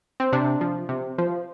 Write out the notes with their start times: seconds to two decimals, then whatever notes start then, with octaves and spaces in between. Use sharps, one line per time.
0.20 C4
0.33 C3 D4
0.61 F3
0.89 C3
1.18 F3